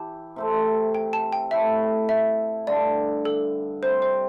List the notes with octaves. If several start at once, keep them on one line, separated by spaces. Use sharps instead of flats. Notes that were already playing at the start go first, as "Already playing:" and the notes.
Already playing: E3 E4 G4 A5
C3 A3 C4
G5
A5
G5
A2 A3 E4 E5
E5
G2 D3 A3 D5
A4
C3 G3 C4 C5
C5